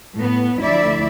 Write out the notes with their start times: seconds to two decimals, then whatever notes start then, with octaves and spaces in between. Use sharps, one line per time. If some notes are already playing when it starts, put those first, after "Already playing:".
0.18 A2 B3
0.62 D2 F3 E4 D5 E5